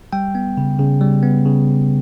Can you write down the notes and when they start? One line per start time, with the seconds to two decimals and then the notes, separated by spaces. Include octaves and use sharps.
0.13 G3 G5
0.35 B3
0.58 C#3
0.79 C#3
1.01 G3
1.22 B3
1.45 C#3